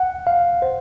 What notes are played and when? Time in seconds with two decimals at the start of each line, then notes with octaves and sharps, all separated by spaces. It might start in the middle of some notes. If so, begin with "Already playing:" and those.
Already playing: F#5
0.27 F5
0.62 C5